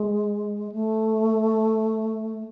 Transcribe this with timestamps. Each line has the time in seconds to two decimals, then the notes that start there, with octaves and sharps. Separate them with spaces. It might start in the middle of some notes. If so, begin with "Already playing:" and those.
Already playing: G#3
0.72 A3